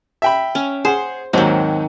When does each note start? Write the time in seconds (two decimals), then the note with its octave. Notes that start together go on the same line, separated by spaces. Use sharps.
0.22 E5 G5 B5
0.55 C#4
0.85 G#4 C5 F#5
1.33 D#2 G#2 D#3 F#3 C4